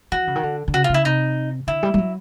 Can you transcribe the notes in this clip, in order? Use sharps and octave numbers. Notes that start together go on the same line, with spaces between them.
E3 F#4
C#3
D#3
D3
D3
C#3 F#4
F4
C#3 E4
C3 D#4
D3 E4
G3
G3
F#3